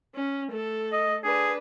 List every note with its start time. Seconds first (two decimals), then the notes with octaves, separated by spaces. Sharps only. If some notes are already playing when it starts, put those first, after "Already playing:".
0.15 C#4
0.52 A3 A4
0.92 D#5
1.24 D4 G#4 B4